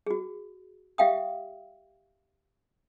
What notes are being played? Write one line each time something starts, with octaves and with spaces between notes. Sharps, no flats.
F#4 G#4
G4 E5 F5 G5 D#6